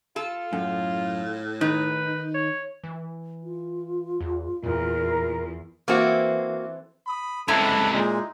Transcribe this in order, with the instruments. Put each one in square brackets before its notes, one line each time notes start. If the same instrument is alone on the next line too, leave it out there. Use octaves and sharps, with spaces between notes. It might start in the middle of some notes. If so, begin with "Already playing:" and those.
[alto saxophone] F4 [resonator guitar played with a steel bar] A4
[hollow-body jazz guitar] F#2 [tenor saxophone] A2
[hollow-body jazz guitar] D#3 [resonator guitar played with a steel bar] D#4 [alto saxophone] B4
[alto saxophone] C#5
[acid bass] E3
[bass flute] F4
[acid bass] E2
[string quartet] E2 [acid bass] A#2 [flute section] A#4
[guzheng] E3 C4 A4 [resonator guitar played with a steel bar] A#3 F#4
[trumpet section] B5 D#6
[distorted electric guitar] C#2 C3 [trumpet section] D4 B4 [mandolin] E4 A#5 C6 [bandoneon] A4
[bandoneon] A#2 G#3 [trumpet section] D#4